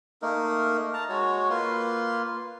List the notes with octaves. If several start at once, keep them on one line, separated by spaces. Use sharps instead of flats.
A3 A#3 D#4 A#4
A5 A#5
G#3 F#4 C#5
A#3 F4 B4 C6